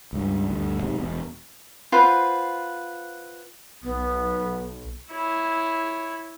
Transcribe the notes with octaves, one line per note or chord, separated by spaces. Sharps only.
C#2 G2
D2 G2
B1 G#2 C3
E1 B2
F4 B4 C5 F#5
B1 B3
E4 C#5